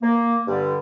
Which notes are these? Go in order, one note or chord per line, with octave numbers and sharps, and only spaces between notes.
A#3
G2 D3 G3